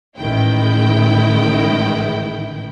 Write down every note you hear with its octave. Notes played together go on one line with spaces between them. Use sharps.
A1 A2 D#3 G#3 E4 G5